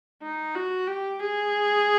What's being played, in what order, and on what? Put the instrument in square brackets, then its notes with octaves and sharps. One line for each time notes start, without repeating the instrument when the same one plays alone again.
[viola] D#4
F#4
G4
G#4